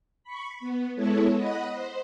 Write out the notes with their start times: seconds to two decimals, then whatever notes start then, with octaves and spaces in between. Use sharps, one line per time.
0.23 B5 C#6
0.60 B3
0.96 G#3 B3 E4 A4 C#5
1.36 D#5 F#5 B5
1.72 C5